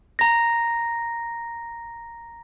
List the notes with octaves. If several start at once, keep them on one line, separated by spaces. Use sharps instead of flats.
A#5 A#6